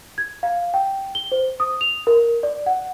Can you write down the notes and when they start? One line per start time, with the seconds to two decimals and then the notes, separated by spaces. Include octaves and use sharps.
0.18 G#6
0.43 F5
0.74 G5
1.15 G7
1.32 C5
1.60 D#6
1.81 F7
2.07 A#4
2.43 D5
2.66 F#5